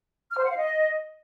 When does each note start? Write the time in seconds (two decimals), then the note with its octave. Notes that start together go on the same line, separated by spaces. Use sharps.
0.32 F6
0.38 C5
0.44 F#5
0.50 F5
0.57 D#5